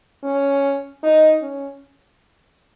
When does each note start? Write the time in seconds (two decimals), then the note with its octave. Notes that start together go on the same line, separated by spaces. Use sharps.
0.23 C#4
1.03 D#4
1.41 C#4